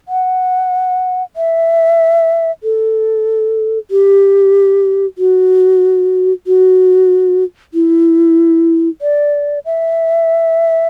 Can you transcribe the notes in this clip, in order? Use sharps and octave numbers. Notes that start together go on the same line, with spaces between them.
F#5
E5
A4
G4
F#4
F#4
E4
D5
E5